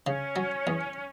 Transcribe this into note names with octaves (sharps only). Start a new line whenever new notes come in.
C#3 C#4
F#3
E2